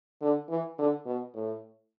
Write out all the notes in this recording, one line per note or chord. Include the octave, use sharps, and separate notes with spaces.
D3
E3
D3
B2
A2